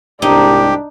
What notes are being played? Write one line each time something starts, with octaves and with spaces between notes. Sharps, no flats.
C2 G#2 D4 D#4 G4